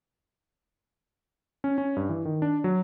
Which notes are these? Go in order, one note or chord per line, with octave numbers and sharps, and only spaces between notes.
C#4
C#4
G2
E3
D#3
D4
F#3